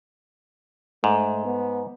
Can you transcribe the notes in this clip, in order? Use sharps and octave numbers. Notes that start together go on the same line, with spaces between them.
G#2 A3
B3